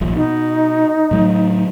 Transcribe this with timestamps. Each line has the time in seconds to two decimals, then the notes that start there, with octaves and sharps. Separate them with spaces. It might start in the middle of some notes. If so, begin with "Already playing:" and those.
0.01 D#1 A#1 A#2
0.16 B2 D#4
1.11 A2 F#3 A3